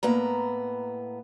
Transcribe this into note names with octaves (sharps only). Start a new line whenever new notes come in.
A2 A#3 B3 A#5